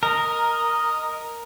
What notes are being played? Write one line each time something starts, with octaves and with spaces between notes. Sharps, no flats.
A#4 D#5